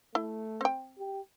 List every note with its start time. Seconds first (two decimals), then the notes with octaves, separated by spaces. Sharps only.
0.15 A3 E4
0.61 C4 G5
0.99 G4